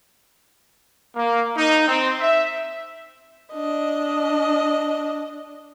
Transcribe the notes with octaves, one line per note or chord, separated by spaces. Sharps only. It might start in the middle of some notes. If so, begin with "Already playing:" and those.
A#3
D#4
C4
E5
D4 D#5